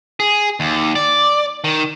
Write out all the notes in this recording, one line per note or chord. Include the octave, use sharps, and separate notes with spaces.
G#4
D#2
D5
D#3